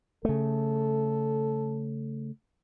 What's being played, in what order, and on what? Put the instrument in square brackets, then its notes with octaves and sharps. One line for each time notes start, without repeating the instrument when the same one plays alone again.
[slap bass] C#3 A3 [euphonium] A4